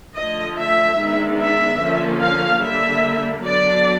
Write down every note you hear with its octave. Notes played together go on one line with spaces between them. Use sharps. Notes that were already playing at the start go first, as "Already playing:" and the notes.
D3 F3 A3 D#5
E5
D#3 G#3 B3 D4
E5
D3 F3 A#3 C#4
F5
D3 G3 A#3 E5
D3 F#3 B3 D4 D5